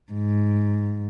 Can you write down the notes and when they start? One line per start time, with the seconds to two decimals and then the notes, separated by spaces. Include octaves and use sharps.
0.13 G#2